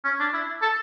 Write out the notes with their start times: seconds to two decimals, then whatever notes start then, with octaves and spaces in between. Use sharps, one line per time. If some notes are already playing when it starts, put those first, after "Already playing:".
0.05 C#4
0.20 D4
0.33 E4
0.62 A4